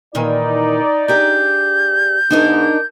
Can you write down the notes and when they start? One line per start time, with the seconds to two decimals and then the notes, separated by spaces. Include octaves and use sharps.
0.15 A#2 D#3 E3 D#4 D5
1.08 D4 G4 G#4 G6
2.31 E2 G#2 D4 D#4 A#4